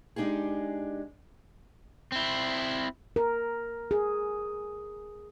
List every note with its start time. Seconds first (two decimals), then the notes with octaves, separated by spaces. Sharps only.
0.16 G#3 D4 D#4 G4 G#4
2.12 C4 E4
3.16 A#4
3.91 G#4